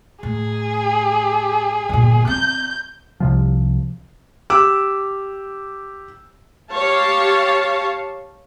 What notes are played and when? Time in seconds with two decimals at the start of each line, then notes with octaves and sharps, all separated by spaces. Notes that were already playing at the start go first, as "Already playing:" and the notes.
0.23 A2 G#4
1.89 G1 A#2
2.27 C4 G6
3.20 C2 C3 F3
4.50 G4 D6 E6
6.71 G4 C#5 F5 A5